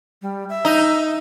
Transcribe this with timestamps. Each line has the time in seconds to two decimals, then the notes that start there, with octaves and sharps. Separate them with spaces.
0.22 G3
0.49 E5
0.65 D#4